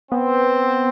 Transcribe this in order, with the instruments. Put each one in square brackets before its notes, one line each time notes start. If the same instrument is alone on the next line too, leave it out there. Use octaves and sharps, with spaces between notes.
[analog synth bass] B3 [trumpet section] C4